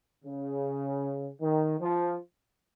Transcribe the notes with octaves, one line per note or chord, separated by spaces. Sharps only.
C#3
D#3
F3